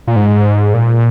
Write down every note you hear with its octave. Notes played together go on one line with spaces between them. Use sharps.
A#2
G#2
A#2